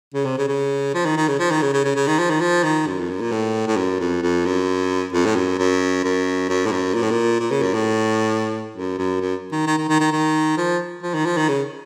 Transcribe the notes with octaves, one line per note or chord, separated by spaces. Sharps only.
C#3
C3
C#3
C#3
F3
D#3
D#3
C#3
F3
D#3
C#3
C#3
C#3
C#3
D#3
F3
D#3
F3
D#3
F#2
F2
F#2
A#2
A2
A2
F#2
F2
F2
F#2
F2
A2
F#2
F#2
F#2
F#2
A2
F#2
A#2
A2
A#2
A#2
C#3
F#2
A2
F#2
F#2
F#2
D#3
D#3
D#3
D#3
D#3
D#3
F3
F3
D#3
F3
D#3
C#3